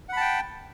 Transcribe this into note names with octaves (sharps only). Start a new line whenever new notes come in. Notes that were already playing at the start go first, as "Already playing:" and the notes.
F#5 G5 A5 B5